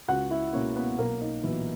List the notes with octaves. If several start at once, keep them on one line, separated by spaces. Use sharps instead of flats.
C#2 F#4 F#5
E4 E5
B2 A#3 C#4 C#5
B3 B4
B1 A#3 A#4
D#4
A#2 E3 F#3 B3 E4